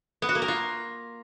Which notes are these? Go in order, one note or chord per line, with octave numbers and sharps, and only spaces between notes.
B3
F#4
A#3
A#4
F4